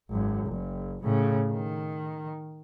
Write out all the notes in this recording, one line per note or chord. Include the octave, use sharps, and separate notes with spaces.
G#1 F#2
F#1
A2 C#3
D#3